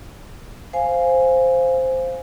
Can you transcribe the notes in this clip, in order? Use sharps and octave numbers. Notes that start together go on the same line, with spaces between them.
C5 F5 G#5